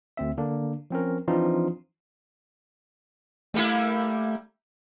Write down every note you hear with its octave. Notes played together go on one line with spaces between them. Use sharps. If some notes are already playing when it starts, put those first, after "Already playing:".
D2 C4 E5
D3 A#3 D4
F3 C4 C#4 A#4
E3 F3 C4 D4 D#4 F4
G3 A3 A#3 E4